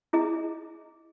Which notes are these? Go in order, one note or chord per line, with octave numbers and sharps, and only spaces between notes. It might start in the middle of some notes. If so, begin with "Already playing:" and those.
E4 G#4 D#5